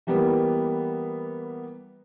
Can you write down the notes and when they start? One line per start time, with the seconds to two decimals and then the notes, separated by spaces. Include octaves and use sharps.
0.07 E3 G3 A#3 B3